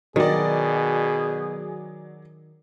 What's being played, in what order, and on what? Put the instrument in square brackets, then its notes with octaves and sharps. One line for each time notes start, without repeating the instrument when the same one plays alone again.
[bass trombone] B2 [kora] D#3 [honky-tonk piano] F#3 D5 [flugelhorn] G#4